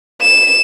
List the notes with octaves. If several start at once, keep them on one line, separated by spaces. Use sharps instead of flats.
E7